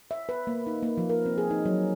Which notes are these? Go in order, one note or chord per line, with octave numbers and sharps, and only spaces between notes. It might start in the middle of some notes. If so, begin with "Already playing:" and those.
E5
B4
A#3
D#4
A#3
F3
A#4
C4
G#4
D#4
F#3